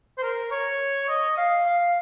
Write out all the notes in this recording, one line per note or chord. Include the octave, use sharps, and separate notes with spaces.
C5
A#4
C#5
D#5
F5
F5